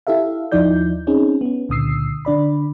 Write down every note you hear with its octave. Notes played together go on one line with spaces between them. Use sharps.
E4 G4 A4 E5 F5
D#2 F3 D#4 E4 D5 G6
C4 C#4 D#4 G#4
B3 C#4
C#2 A#2 D3 D#6 E6 C7
D3 D4 D5 B5